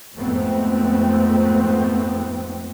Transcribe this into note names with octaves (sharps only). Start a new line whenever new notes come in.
F2 G#2 A3 B3 C4